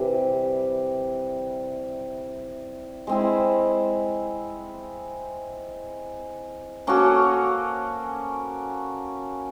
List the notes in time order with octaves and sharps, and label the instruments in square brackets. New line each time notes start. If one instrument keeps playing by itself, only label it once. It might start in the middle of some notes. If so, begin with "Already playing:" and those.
Already playing: [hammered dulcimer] C3 E3 G3
G#3 C4 E4
A#3 C#4 F#4 A4